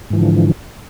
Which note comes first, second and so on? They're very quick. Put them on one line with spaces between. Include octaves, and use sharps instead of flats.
G#2 E3 F3 D3